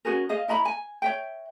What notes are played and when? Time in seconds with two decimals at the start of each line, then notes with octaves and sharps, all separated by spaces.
0.05 C#4 F#4 G#4 A#4
0.29 G#4 D#5 F5
0.48 E4 D#5 A#5 B5
0.65 G#5
1.02 C#5 E5 G5